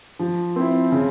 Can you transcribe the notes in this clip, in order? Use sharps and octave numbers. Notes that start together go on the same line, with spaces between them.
F3
C4 E4
C#3